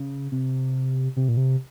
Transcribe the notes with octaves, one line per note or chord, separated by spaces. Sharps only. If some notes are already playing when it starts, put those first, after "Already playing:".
Already playing: C#3
C3
C3
A#2
C3